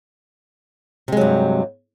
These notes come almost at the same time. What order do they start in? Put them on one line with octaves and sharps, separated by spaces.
C3 G#3 F#3 G2